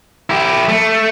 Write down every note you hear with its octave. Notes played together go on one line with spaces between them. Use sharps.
E4 G4
A3